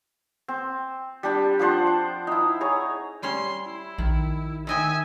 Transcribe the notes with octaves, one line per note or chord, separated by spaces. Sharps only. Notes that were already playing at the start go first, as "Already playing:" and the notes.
C4
G3 D4 G4
F3 D4 C5 F#5
D6
D#4 E4
G#4 C#5 A#5
G3 C#4 C#5 C6
E4
A#1 D#3
D#3 D#5 E5 G5 G#5